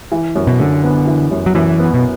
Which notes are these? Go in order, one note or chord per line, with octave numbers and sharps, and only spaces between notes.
E3
F#2
B2
F#2 D3
B3
E3
F#2
F#3
F#2 E3
B3
B2